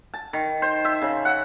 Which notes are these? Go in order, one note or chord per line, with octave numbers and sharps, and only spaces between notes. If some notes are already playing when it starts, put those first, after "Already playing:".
A5
D#3
C5
E5
C#3
F#5